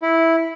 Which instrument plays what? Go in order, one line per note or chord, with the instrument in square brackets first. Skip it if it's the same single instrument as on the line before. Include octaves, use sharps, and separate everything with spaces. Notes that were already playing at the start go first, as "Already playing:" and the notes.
[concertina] E4